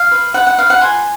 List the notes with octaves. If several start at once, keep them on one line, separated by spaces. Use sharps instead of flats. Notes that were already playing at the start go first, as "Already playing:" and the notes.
Already playing: F5
B4
B4 F#5
F#5
B4 F5
F#5
F4 G#5